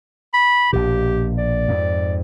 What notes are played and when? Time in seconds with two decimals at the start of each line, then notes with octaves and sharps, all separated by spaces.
0.34 B5
0.73 A#1 B2 G4
1.38 D5
1.68 F2 G#2